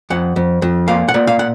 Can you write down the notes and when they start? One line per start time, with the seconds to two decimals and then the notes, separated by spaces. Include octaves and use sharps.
0.10 F2 F#5
0.36 F2
0.62 F2
0.88 A#2 F5
1.08 F#5
1.14 A#2
1.27 F5
1.39 F#5